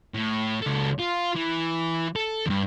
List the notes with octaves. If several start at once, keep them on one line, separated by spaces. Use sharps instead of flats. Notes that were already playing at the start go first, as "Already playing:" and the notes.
A2
C#2 A4
F4
E3
A4
E2 G2